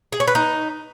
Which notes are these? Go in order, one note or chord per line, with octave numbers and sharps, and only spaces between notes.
G#4
C#5
B4
D#4